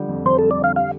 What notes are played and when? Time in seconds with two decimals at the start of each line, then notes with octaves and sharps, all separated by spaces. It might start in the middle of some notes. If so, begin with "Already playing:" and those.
Already playing: D3 F3 G3
0.09 F2
0.25 F2 C5
0.39 G3 A4
0.51 D5
0.59 D3 F5
0.76 G4 F5